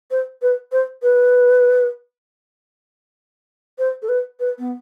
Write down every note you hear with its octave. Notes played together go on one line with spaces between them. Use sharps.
C5
B4
C5
B4
C5
A4
B4
B4
B3